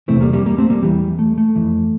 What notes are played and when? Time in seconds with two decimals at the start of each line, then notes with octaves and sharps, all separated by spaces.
0.08 E2 C3 E3 A3 C4
0.21 G3 A#3
0.33 G3 A#3
0.46 G3 A#3
0.58 A3 C4
0.70 G3 A#3
0.83 E2 E3 G3
1.19 A3
1.38 A3
1.56 F2 E3